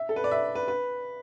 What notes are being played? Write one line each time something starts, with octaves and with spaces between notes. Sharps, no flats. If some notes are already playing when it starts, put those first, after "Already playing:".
Already playing: E5
A4
B4
D5
E5
B4
B4